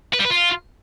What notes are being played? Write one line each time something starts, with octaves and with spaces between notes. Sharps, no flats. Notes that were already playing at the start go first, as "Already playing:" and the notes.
B4
G3
B4
F4